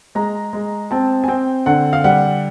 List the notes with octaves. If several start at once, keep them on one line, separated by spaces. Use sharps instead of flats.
G#3 A#5
G#3
C4 A5
G#5
C4 G5
D3 F#5
F5
G3 F#5